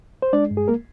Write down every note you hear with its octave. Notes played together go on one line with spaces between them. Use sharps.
C5
G#3 D4 D5
G2
G#4
A#3 A#4